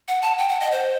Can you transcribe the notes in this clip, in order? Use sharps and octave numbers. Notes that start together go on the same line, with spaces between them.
F#5
A5
G5
F#5
D#5
C5